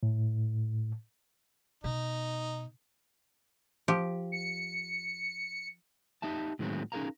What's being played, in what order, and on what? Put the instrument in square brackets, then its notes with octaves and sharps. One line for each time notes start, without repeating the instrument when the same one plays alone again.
[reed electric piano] A2
[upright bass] B2 [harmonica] D#4
[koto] F3 G4
[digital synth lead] C#7
[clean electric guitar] D#4 G4 E5 A5
A2 D#3 F#3 G#3 B3 C4
C#4 D#4 G#4 A#4 F5 A#5